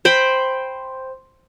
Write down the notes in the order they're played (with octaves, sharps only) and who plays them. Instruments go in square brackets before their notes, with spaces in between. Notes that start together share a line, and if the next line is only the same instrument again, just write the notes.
[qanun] C5 G5 B5